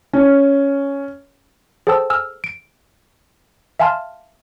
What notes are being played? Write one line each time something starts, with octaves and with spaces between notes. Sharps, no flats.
C#4
G#4 A4 C5 G5 A5 E6
G#5 E6 F6
D7
E5 F5 G#5 A5 C6 F6